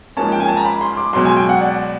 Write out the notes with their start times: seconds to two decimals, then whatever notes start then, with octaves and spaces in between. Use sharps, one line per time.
0.17 G#2 F3 A#3 C#4 A5
0.32 G5
0.40 G#5
0.48 A5
0.57 A#5
0.65 B5
0.81 C6
0.97 D6
1.13 C#2 B2 F#3 C6
1.25 G#5
1.37 G5
1.49 F#5
1.61 D5